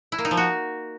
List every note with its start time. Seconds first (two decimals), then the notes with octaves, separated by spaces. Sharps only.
0.12 E4
0.18 A#3
0.25 D#4
0.31 F3
0.37 F#4